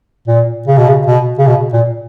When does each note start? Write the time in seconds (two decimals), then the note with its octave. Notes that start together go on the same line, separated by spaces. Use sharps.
0.28 A#2
0.67 C#3
0.78 B2
0.89 C#3
1.07 B2
1.38 C#3
1.47 B2
1.73 A#2